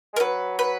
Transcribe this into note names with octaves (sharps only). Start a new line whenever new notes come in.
G#3
A#4
F#3 B4
B4